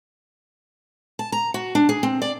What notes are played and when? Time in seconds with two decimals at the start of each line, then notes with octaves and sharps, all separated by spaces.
1.19 A5
1.32 A#5
1.54 F#4
1.75 D4
1.89 G#4
2.03 C4
2.22 D5